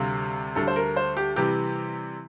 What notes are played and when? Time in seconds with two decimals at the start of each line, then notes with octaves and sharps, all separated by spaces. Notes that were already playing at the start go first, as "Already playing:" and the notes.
Already playing: D2 C3 G3 F5
0.55 D2 D3 G3 A4
0.67 C5
0.76 A#4
0.96 C5
1.17 G4
1.36 C3 E3 G3 G4